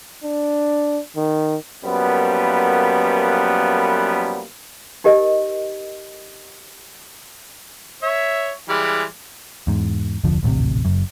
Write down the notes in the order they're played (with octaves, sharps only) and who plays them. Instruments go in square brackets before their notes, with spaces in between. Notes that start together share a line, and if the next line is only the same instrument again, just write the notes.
[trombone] D4
D#3
[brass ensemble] F#2 F3 G3 A#3 B3
[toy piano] D#4 G4 A#4 D#5
[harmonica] C#5 E5
E3 G3 G#3
[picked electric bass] E2 G#2
F1 D2 D3 F3
D#1 A1 D2 C3
F#1 F#2